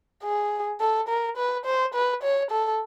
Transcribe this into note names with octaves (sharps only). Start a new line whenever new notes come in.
G#4
A4
A#4
B4
C5
B4
C#5
A4